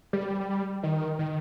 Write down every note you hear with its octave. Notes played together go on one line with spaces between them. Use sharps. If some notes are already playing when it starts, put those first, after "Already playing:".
G3
D#3
D#3